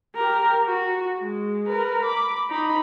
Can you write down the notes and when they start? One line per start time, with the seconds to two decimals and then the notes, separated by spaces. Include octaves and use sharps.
0.15 G4 A#4
0.65 F#4
1.19 G#3
1.67 A#4 B4
2.03 B5 D6
2.50 D#4 B5